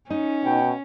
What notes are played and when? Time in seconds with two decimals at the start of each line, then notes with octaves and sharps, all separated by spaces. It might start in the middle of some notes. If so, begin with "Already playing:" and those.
0.10 C#4 D#4
0.44 B2 G5